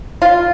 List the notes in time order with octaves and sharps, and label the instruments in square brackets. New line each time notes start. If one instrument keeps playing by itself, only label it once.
[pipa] F4